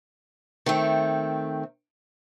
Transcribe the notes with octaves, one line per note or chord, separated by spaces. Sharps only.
D#3 A3 C4